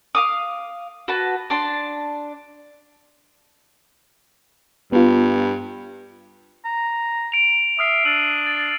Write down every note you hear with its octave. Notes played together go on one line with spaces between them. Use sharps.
F5 D6 D#6
F#4 B4 A5
D4 A5 C6
G2 B3 F4
A#5
D7 F7
E5 D#6 F6 C7
D4 E6 D#7 F#7
A6